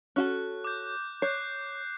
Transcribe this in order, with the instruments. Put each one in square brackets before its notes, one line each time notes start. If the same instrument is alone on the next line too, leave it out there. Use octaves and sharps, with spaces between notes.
[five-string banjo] C#4 F#4 A4 [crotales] F#6
[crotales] D6 G6
[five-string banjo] C#5 [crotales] F#6 G6 C7